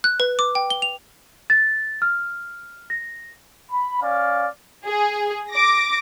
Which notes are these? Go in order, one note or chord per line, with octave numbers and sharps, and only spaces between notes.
F#6
B4
D6
G5
G7
F7
A6
F6
A#6
B5
C#4 D5 F5
G#4
D6 A#6